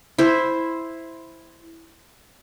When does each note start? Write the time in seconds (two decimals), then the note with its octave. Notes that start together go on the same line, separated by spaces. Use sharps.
0.18 E4 C5